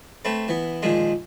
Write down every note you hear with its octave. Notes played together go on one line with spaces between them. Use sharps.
A3 C4 B4
E3 B3
A#2 D#3 F3 G#3